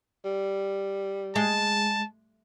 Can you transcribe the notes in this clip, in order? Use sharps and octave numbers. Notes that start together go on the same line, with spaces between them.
G3
G#3 A5